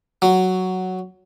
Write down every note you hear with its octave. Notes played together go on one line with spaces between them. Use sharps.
F#3